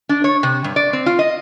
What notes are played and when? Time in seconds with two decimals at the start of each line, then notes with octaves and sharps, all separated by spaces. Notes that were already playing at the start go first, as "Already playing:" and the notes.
0.09 D4
0.24 C#5
0.43 C3
0.64 G2
0.76 D5
0.93 C4
1.06 F4
1.19 D#5